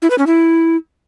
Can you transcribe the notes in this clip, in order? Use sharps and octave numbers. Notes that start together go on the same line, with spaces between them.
E4
B4
C#4
E4